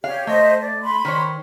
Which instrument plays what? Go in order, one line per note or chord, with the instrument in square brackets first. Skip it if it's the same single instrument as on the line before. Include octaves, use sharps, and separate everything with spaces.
[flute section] G4 C#5 [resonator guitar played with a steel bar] F5
[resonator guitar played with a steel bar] A3 [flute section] C5 D#5 E5
[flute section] D5
B5 C6
[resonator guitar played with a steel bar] D#3 C5 C#5